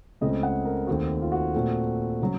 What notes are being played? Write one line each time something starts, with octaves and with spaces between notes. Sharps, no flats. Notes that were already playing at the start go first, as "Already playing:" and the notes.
C#2 C#3 A3 C4 D#5
F#5
A#4
D#2 D#3 A3 C4 F#4
F4
F#4
A#2 A3 C4
C#3 F#3